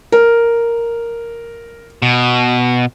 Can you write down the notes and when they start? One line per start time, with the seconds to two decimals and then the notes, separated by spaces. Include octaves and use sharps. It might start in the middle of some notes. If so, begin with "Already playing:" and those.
0.12 A#4
2.02 B2